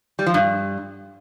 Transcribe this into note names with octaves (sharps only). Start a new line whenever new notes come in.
G3
F3
G2